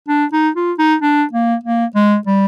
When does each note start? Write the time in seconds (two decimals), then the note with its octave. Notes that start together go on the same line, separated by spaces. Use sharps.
0.09 D4
0.33 D#4
0.56 F4
0.79 D#4
1.02 D4
1.33 A#3
1.64 A#3
1.95 G#3
2.27 G3